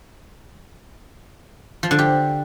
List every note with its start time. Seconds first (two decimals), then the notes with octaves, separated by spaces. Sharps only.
1.83 F3
1.91 D3
1.99 G4